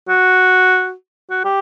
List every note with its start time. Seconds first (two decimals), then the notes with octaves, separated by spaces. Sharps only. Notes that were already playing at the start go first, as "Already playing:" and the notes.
0.09 F#4
1.30 F#4
1.44 G4